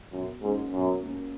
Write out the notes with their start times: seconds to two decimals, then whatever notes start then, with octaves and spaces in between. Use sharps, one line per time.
0.12 F#2 B2
0.41 G#2 A#3 C#4
0.72 F#2 B2
1.02 A#3 C#4